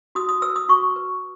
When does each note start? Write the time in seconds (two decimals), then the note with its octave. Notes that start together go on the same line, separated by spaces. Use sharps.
0.15 F#4 D#6
0.29 D#6
0.42 B4 E6
0.56 D#6
0.69 F#4 C#6
0.96 B4